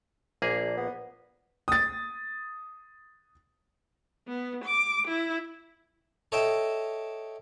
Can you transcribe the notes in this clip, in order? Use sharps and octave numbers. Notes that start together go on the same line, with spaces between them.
A#1 A#3 D4 G#4
B3
D#6 A6
B3
D6
E4
A4 C#5 D#5 E5 G5 A5